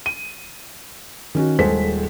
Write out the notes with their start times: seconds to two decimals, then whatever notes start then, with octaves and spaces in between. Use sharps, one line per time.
0.06 D#7
1.35 D#3 C#4 F#4
1.59 D#1 G#3 G#4 A4 C5 B6